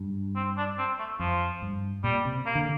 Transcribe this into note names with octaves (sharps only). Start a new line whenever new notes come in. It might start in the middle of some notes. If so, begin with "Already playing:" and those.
Already playing: G2
C4
D4
C4
A3
F2 F3
G2
A#2 G3
C3
A#3
D3